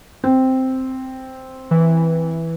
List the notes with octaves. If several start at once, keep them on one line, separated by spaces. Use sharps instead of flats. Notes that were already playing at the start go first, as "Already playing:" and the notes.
C4
E3